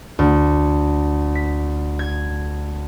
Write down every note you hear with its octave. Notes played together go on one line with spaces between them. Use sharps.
D2
B6
G#6